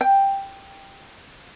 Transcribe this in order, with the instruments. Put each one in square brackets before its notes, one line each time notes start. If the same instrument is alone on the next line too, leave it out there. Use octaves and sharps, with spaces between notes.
[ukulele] G5